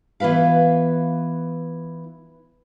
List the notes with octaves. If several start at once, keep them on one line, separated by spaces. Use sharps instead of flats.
E3 B3 F4 B4 F5